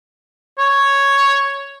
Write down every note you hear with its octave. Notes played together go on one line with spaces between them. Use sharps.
C#5